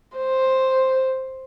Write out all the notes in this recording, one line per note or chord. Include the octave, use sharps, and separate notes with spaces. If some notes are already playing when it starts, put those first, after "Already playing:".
C5